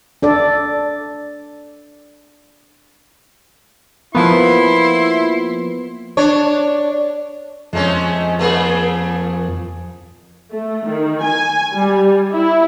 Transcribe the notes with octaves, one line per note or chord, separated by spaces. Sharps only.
D4 A4 D5
F3 A#3 B3 E4 C6
D4 C#5
F2 G#3 A3 C#4
A3 A#3 G#4
A3
D#3
G#5
G3
E4